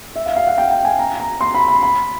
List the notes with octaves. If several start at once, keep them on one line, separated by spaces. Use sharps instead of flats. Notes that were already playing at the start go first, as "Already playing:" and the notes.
E5
F5
F5
F#5
G5
G5
G#5
A#5
A#5
C6
B5
B5
B5